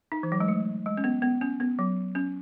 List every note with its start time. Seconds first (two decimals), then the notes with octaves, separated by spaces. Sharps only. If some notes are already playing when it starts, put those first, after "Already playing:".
0.12 D#4
0.23 E3
0.32 F#3
0.40 G#3
0.48 A3
0.86 G#3
0.97 C#4
1.04 B3
1.22 B3
1.41 C#4
1.60 B3
1.79 F#3
2.15 C#4